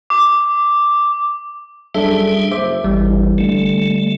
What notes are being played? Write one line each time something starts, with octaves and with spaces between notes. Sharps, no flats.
D6
F#2 G3 D4 G#4 A4 E5
F#1 C5 E5 D6
G#1 E3 G3
D3 A3